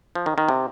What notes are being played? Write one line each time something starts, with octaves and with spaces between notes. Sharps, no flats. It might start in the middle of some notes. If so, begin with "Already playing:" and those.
F3
D#3
D#3
C3